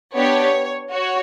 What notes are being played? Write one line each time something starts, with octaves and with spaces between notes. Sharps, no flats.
B3 D4 G4 C#5
F#4 C#5